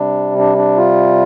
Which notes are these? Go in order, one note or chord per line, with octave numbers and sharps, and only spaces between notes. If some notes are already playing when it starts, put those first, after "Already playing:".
Already playing: C3 G3 D4
D4
D4
F4